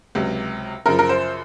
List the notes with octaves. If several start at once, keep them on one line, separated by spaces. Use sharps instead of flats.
C#2 C3 F#3
F#2 C#3 F3 A#4
A#4
C5